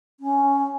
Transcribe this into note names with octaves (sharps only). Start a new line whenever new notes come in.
C#4